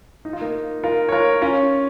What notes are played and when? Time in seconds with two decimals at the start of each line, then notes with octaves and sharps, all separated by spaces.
0.25 D#4
0.33 F4
0.41 A#3 D#4
0.84 F4 A#4
1.09 C#5
1.12 F4 A#4
1.42 C#4 F4